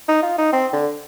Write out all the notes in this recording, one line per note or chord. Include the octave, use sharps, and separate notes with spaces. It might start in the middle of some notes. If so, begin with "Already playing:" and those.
D#4
F4
D#4
C4
D3